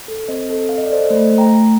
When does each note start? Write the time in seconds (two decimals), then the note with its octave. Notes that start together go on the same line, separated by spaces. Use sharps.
0.08 A4
0.28 C4 C5 D#5
0.50 A4
0.69 A4 F5
0.78 D#5
0.85 D5
0.90 A4 C5 D#5
1.10 A3 C5 D#5
1.31 A3
1.38 G5 A#5
1.52 A3